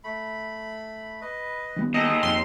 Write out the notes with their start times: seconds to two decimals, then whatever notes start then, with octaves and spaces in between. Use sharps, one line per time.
0.04 A3 B5
1.21 B4 D#5
1.76 D#3 G3 B3
1.94 D#2 G#4 A4 D#5 A#5
2.23 F2 C6